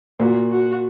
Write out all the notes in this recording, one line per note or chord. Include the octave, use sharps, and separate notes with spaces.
A#2 F#4
F#4